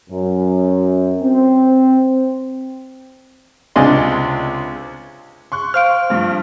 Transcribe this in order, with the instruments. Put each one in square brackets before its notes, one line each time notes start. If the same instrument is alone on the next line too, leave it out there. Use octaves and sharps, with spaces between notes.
[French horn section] F#2
C4
[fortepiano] C#2 C3 D4 G#4 D#5 C6
[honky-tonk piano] C6 C#6 F#6
[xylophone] C5 F5 D7 [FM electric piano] F6
[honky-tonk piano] G2 F3 G3